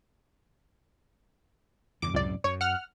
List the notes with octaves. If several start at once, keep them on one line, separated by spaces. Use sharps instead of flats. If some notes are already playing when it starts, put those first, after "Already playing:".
E2 G2 C#3 D6
C#2 F#2 A2 C3 D5
F#2 C#5
F#5 F6